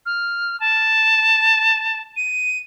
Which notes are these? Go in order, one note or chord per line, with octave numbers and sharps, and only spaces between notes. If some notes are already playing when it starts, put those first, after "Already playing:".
F6
A5
D#7